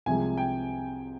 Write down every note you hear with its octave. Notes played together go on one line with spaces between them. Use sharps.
C2 C3 F3 G#3 G#5
G5